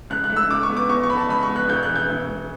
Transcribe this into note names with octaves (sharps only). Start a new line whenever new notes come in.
C#2 F#6
F#6
A3
E6
C#2 D6
C#6
B3
D6
E2 C#6
C#6
E2 B5
A5
C#2 B5
C#6
B3
F#6
E1 G6
F#6
E3
G6
E1
E1